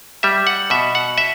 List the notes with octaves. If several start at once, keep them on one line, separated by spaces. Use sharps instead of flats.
G3 E5
F#5
B2 E5
F#5
E5